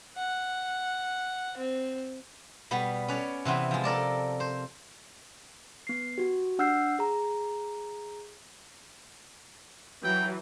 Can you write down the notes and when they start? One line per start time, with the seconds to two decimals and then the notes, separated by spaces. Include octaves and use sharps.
0.16 F#5
1.57 C4
2.71 B2 G3 B3
3.08 C#4 B4 C#5 D5
3.45 C3 E3 B3 C4
3.71 F3 G#3
3.84 A4 A#4 D5 A5
4.40 C5
5.87 B3 C7
6.18 F#4 G4
6.59 D4 F#5 E6 F6 G6 C7
6.99 G#4 A#5
10.04 E3 F#3 G5